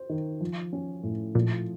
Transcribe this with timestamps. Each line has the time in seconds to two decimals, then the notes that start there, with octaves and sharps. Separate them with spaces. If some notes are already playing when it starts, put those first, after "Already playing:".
Already playing: C5
0.09 D#3
0.41 F3
0.73 C#4
1.03 A2
1.35 A#2 F3